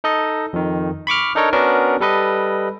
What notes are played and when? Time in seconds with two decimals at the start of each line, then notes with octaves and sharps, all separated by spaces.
0.04 D#4 A4 D#5
0.53 F2 D#3
1.07 B5 C#6 D6 F6
1.35 D4 D#4 A4 A#4 C#5
1.53 B3 C#4 D4 F#4 A#4
2.00 G3 A4 B4 D#5